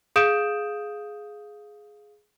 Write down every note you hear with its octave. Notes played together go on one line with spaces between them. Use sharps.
G#4 F5 D#6 G6 D7 E7